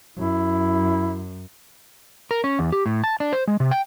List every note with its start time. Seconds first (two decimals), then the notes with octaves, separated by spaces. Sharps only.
0.17 F#2 E4
2.31 A#4
2.44 C#4
2.59 E2
2.72 G4
2.86 A2
3.04 A5
3.20 D4
3.33 C5
3.48 G#3
3.60 C3
3.71 G5